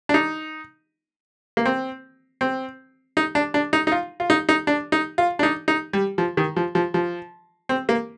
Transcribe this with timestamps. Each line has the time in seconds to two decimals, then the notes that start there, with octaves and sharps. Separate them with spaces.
0.09 D4
0.14 D#4
1.57 A#3
1.66 C4
2.41 C4
3.17 D#4
3.35 D4
3.54 D4
3.73 D#4
3.87 D#4
3.92 F4
4.20 F4
4.30 D#4
4.49 D#4
4.67 D4
4.92 D#4
5.18 F4
5.39 D4
5.43 D#4
5.68 D#4
5.93 G3
6.18 F3
6.37 D#3
6.56 F3
6.75 F3
6.94 F3
7.69 C4
7.89 A#3